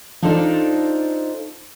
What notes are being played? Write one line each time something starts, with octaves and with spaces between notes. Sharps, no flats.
D4 D#4 F4 A4 C5 D5